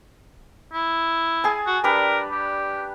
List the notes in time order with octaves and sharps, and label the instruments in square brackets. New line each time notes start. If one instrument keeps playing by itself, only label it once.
[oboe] E4
[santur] G#4 G#5 A5
[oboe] F#4
[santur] G3 D4 B4 [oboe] A#4
[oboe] G4